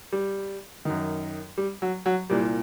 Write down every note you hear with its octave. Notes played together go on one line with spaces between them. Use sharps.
G3
F#2 D#3
G3
F#3
F#3
C2 A#2 G3